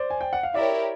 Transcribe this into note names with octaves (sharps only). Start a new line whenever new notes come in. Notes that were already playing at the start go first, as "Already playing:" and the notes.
Already playing: C5 D5
G#5
G5
F#5
F5
E4 G4 A#4 C#5 D5 E5